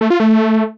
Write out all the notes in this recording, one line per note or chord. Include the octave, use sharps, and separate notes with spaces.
A3
F4
A3